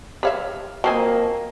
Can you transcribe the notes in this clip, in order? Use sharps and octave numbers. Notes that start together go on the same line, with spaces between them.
G4 B4 C#5 E5 F5
F3 A#3 C4 F#4 A4 A#4 D#5 G#5